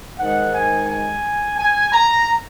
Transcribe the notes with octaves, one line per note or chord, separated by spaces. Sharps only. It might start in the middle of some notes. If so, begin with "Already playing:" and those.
G#2 D#3 G#3 F#5
G#5
G#5
G#5
A#5